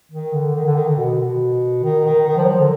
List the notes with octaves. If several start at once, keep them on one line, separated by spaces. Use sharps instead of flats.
D#3
D3
D#3
D3
D#3
D3
B2
B2
D#3
D#3
D#3
F3
F#3
F3
D3